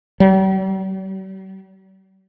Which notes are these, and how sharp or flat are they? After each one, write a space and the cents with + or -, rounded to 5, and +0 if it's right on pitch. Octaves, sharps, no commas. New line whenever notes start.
G3 -45